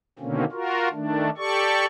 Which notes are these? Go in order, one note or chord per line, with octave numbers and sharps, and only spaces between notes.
B2 D3 D#3 A#3 C4 C#4
F4 F#4 A#4
D#3 A3 D4
G4 A4 D5 C#6